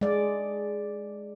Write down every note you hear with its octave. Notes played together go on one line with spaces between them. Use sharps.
G#3 D5